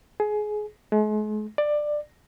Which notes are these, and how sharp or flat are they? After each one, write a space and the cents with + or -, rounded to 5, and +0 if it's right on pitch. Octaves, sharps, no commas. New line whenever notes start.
G#4 +20
G#3 +40
D5 +15